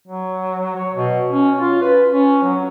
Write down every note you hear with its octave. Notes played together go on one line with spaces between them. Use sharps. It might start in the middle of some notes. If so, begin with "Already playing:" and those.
F#3
C#5
B2
C#4
F4
B4
C#4
F#3